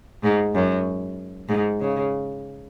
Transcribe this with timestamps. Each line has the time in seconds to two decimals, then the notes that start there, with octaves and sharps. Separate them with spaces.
0.23 G#2
0.54 F#2
1.49 G#2
1.81 C#3